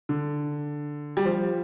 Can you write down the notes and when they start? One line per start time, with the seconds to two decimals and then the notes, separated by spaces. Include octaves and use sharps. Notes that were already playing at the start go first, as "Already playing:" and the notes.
0.09 D3
1.17 G3
1.25 F3